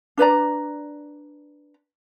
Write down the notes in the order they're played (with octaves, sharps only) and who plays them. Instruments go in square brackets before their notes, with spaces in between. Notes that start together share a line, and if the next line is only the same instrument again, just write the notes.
[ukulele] D4 B4 D5 A#5